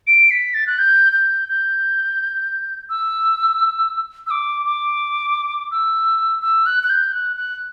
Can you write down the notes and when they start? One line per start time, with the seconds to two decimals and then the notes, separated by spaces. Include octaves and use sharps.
0.07 D7
0.31 B6
0.54 A6
0.67 F#6
0.79 G6
1.13 G6
1.49 G6
2.90 E6
4.27 E6
4.31 D6
4.66 D6
5.72 E6
6.42 E6
6.66 F#6
6.83 F#6
6.90 G6
7.12 F#6
7.37 F#6